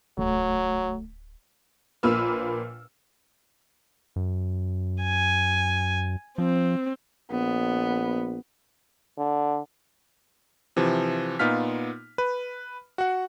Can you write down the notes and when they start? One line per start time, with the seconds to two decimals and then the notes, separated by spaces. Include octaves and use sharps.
0.18 D1 C2 F#3 A3
2.03 A#1 A#2 A#3 B4 E6 F6
4.16 F#2
5.03 G#5
6.38 F3 C4
7.31 A#1 B3
9.18 D3
10.77 C3 E3 F3
11.39 A#2 B3 D#4 F4 F6 B6
12.18 B4
12.98 F#4 F#5